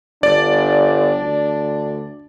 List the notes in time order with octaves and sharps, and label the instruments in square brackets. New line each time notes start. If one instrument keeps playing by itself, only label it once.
[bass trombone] G1 [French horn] D4 [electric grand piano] D5
[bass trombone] D2